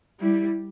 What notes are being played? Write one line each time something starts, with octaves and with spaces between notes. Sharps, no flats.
G3 E4